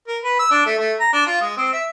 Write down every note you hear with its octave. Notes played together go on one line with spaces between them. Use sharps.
A#4
B4
E6
D4
A3
A3
A#5
D4
F4
G#3
C4
E5